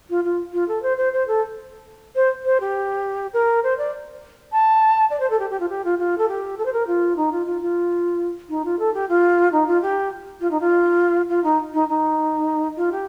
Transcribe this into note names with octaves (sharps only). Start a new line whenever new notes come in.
F4
F4
F4
A4
C5
C5
C5
A4
C5
C5
G4
A#4
C5
D5
A5
D5
C5
A4
G4
G4
F4
G4
F4
F4
A4
G4
A4
C5
A#4
F4
D#4
F4
F4
F4
D#4
F4
A4
G4
F4
D#4
F4
G4
F4
D#4
F4
F4
D#4
D#4
D#4
F4
G4